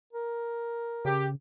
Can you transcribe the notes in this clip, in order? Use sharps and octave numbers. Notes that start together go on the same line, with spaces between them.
A#4
C#3 G4